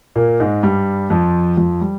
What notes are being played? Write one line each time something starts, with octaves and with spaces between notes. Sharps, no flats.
A#2 A#3
G#2 G#3
G2 G3
F2 F3
F2 F3
G3